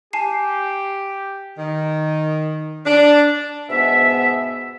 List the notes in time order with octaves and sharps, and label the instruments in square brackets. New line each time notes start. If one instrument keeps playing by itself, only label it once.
[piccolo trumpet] G4 [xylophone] G#5 A5 C7
[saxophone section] D#3
D4
[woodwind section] G#2 B2 B3 E5